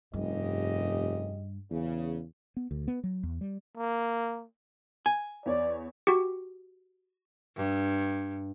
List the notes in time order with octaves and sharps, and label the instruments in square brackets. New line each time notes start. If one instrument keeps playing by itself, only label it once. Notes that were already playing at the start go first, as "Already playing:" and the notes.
[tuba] F1 [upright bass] G2 [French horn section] C#3 G4 D#5
[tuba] E2 [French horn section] C#3
[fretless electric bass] B3
D2
B3
F#3
E2
G3
[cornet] A#3
[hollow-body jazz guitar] G#5
[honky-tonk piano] E2 C#5 [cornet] D5
[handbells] F#4 G4
[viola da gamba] G2